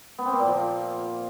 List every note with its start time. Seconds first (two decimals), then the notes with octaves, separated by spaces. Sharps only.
0.19 B3
0.25 C4
0.32 A#3
0.39 A#2
0.46 F3